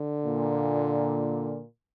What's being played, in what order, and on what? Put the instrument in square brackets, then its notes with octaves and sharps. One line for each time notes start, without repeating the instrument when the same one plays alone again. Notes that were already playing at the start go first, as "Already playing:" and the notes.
Already playing: [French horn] D3
[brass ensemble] A#2